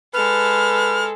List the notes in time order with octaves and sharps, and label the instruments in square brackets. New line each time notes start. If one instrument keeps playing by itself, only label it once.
[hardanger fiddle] G#3 A4 [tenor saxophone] B4 [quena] F6